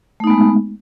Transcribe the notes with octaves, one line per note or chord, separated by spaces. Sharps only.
G#3 A3 B3 D#4